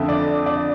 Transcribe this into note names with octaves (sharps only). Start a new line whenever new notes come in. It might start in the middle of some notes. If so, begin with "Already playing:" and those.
Already playing: F2 D3 A3 E5
D5
D5